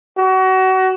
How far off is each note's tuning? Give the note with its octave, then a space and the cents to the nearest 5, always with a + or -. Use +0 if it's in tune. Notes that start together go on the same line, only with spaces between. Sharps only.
F#4 +30